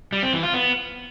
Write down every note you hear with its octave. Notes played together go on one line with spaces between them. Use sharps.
G3
C4
E3
F4
B3